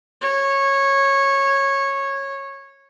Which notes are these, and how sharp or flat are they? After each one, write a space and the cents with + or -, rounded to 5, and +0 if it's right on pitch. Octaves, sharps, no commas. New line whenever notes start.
C#5 -15